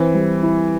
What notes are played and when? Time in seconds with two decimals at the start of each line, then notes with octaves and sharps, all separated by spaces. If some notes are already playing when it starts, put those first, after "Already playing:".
Already playing: E3 C4
0.14 G3
0.43 E4